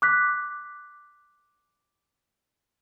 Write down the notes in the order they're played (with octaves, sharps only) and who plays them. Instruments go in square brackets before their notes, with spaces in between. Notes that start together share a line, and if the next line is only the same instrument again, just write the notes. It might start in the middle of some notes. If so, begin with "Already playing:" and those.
[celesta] D6 F#6 B6